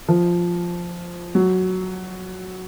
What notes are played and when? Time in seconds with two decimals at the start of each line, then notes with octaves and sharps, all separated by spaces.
0.09 F3
1.35 F#3